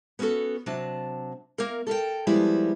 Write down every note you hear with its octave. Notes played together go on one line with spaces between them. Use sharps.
B3 C#4 F#4 G4 A4
C3 F#3 D4 A5
A#3 A#4
A4 A#4 E5 G5
F3 G3 G#3 B3 E4